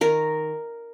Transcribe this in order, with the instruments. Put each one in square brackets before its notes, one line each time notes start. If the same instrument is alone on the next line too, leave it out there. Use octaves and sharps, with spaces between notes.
[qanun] D#3 A#4